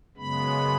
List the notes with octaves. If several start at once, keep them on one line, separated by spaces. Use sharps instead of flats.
F#2 C#3 G#3 B3 B5